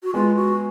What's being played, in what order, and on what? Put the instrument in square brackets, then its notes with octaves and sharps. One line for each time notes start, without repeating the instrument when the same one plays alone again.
[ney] F#4
[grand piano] G#3 B3 [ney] F4
[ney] F#4